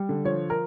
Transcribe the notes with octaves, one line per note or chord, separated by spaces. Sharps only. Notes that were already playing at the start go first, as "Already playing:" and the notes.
Already playing: G3
D3
F3 C#5
A#4